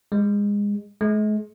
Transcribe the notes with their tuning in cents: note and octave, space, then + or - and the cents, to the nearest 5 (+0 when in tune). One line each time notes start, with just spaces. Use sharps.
G#3 -25
G#3 +40